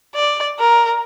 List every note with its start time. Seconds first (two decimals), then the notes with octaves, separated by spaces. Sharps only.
0.16 D5
0.59 A#4